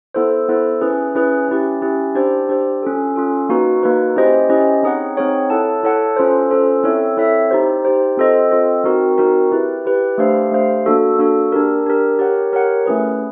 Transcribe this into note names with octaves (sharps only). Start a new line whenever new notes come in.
B3 E4 A4 C5
B3 E4 A4 C5
C#4 E4 G#4 B4
C#4 E4 G#4 B4
C#4 E4 G4
C#4 E4 G4
D4 G4 C5
D4 G4 C5
C#4 F4 A4
C#4 F4 A4
A#3 D#4 F#4 B4
A#3 D#4 F#4 B4
C#4 E4 G4 C5 D#5
C#4 E4 G4 C5 D#5
C4 D#4 G#4 C#5 F#5
C4 D#4 G#4 C#5 F#5
E4 A4 C#5 F#5 A5
E4 A4 C#5 F#5 A5
C#4 F4 A4 C5
C#4 F4 A4 C5
C4 E4 A4 C#5 E5
C4 E4 A4 C#5 E5
D#4 G4 C5
D#4 G4 C5
C4 F4 A4 C5 D#5
C4 F4 A4 C5 D#5
C4 D#4 F#4 A#4
C4 D#4 F#4 A#4
E4 G4 B4
E4 G4 B4
A3 D4 G4 C5 F5
A3 D4 G4 C5 F5
A#3 D4 F#4 A4
A#3 D4 F#4 A4
D4 G4 A#4
D4 G4 A#4
G4 A#4 C#5 F#5
G4 A#4 C#5 F#5
A3 C#4 E4 G#4 B4